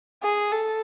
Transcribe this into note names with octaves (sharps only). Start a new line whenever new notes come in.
G#4
A4